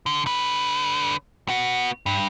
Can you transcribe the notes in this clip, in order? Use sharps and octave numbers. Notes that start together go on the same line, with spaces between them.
D3
D3 B4
B3 F#4
G2